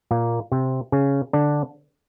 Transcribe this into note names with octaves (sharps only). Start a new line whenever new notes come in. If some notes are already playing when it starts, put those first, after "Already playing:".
A#2 A#3
C3 C4
C#3 C#4
D3 D4